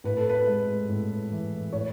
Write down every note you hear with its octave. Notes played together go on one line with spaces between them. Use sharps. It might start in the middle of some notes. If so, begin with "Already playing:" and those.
A2 B4
A4
B4
G#3
A2
E3
A2 C#5